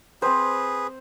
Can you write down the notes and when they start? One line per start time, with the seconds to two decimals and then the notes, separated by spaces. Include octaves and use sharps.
0.22 C4 G#4 B4 C5